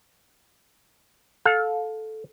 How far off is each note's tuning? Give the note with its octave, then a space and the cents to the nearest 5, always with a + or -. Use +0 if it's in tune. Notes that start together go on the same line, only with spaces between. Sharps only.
A4 -10 F5 +25